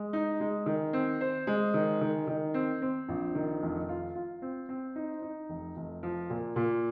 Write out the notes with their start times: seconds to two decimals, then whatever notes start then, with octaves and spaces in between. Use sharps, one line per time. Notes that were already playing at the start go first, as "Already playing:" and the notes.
Already playing: G#3
0.13 D#4
0.40 G#3
0.66 D#3
0.93 C4
1.21 C5
1.47 G#3
1.74 D#3
2.01 D#3
2.27 D#3
2.54 C4
2.82 C4
3.08 A#1
3.35 D#3
3.62 F1
3.89 F4
4.15 F4
4.42 C4
4.69 C4
4.96 D#4
5.22 D#4
5.49 F1
5.77 F1
6.03 F3
6.30 A#2
6.56 A#2